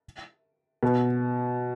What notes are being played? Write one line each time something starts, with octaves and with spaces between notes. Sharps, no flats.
B2